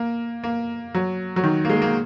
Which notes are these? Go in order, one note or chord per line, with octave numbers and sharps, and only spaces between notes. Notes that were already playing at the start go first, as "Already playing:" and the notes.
Already playing: A#3
A#3
F#3
F#3
D#3
A#3
G#3
A#3